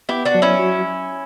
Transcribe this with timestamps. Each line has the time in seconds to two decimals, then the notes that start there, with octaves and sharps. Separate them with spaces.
0.09 B3 E4 G4
0.25 D4 F#4
0.35 F#3
0.42 C#4 E4
0.59 F#4